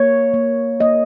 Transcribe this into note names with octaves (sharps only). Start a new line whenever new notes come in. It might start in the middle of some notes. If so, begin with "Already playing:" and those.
Already playing: A#3 C#5
A#3
A#3 D#5